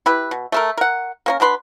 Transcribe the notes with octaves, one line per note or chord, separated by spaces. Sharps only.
E4 G4 B4
B2
A3 A4 A#4
A#4 F#5
A#3 C#4 A#4
F#3 D4 B4 C6